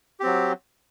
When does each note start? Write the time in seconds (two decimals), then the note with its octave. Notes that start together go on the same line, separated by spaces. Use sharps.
0.20 G4
0.23 C4
0.26 F#3